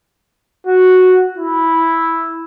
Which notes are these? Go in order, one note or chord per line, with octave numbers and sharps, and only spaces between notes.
F#4
E4